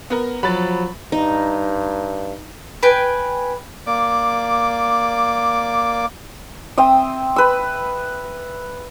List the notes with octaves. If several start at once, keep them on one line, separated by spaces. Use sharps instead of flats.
B3 A#4
F3 F#3 B5 A6
G2 D#4
B4 G5 G#5
A#3 D5 D6
C4 E5 D#6
B4 E6